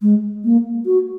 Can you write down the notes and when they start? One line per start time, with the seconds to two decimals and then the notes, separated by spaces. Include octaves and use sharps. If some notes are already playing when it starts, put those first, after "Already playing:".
0.02 G#3
0.44 A#3
0.86 F#4